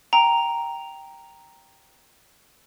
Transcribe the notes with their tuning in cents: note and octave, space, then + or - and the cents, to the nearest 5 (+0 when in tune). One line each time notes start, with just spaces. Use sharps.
G5 +0 A#5 +0